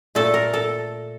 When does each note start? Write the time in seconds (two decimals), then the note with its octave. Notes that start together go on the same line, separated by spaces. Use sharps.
0.15 A#2 A3 A4
0.34 A#4
0.53 A4